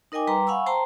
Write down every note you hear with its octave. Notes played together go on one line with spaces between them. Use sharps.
D#4 A#4 D#5 G5 G#5 D6
G3 B4 G5 A#5 C6 D6
F5 F#5 G#5 B5 C#6 E6
C5 G5 A5 A#5 C6